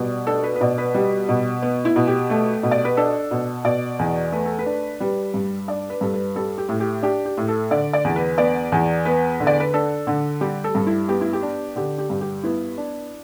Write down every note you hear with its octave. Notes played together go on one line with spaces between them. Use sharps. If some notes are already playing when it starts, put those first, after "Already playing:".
Already playing: B2 G3 D5
D4 A4
B4
B4
B2 D5
B4
G3
B2
B3
E4
B2
G4
A3
B2
D5
B4
D4 A4
B2
B2 D5
E2
A3 B4
A4
B4
D4
G3 B4
G2
D4 D5
B4
G2 A4
B4
G3 A4
G4
A2
G4
D4 G4
G4
A2
A4
D3 D5
D5
E2
B4
B3 D5
E2
B3 B4
D3
D5
B4
D4 A4
D3
G3 G4
A4
G2
E4
B3 G4
E4
G4
D4
D3 G4
G4
G2
G4
B3 E4
D4